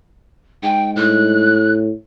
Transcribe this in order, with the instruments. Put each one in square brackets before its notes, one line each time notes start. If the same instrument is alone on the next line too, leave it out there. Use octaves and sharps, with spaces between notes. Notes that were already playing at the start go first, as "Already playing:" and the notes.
[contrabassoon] G#2 [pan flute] G5
[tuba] A2 [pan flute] F#6